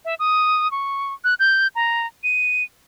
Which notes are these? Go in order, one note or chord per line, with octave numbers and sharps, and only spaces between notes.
E5
D#6
C#6
F#6
G6
A#5
D#7